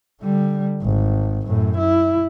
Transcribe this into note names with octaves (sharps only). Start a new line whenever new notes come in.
D3 G3
G#1
F#2 A2
E4